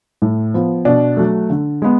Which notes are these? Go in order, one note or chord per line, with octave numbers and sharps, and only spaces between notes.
A2
F3 B3
B2 D4
F#3 A3
D3
G#3 B3